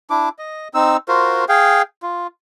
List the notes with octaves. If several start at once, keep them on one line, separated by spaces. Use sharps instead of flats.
D4 E4 D6
D#5
C4 D#4 E6
F4 F#4 A#4 C5
G#4 F5 G5
F4